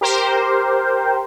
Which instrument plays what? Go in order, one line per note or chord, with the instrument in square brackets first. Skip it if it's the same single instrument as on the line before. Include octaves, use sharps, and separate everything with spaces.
[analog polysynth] G4 A#4 C5